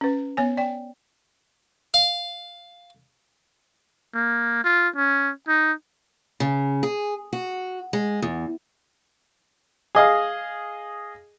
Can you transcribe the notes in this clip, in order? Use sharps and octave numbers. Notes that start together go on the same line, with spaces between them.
C#4 B4
B3 C#5 G#5
D5 G5
F5
A#3
F4
C#4
D#4
C#3
G#4
F#4
G#3
E2
G#4 D#5 F5